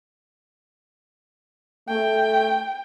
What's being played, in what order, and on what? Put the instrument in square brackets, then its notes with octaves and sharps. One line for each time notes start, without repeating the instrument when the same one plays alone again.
[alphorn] A3 [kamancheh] G5